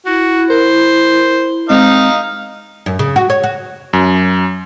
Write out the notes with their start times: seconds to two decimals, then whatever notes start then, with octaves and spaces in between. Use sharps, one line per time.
0.06 E4 F#4
0.50 A#4 C5
1.69 G#3 C4 D#4 D#5 F5
2.86 F#2
2.99 C#3
3.16 F#4
3.30 C#5
3.44 F#4
3.93 F#2